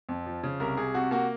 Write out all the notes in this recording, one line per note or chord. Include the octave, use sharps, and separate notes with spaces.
F2
F3
C#3
C2 A#4
C2 G#4
C3 F#4
A#3 F#4